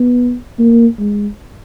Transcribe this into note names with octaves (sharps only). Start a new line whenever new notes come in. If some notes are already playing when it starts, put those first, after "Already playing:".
Already playing: B3
A#3
G#3